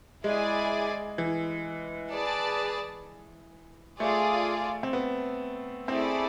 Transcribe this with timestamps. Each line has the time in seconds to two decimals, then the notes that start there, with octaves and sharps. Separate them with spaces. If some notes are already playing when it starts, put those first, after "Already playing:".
0.24 G#3 E4 G#4 D5 G#5
1.18 E3
2.12 G#4 B4 D5 A5
4.00 A3 F4 G#4 D5
4.83 C4
4.93 B3
5.88 A3 C4 E4 G#4 D5